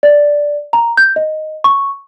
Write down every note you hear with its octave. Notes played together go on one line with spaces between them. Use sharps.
D5
A#5
G6
D#5
C#6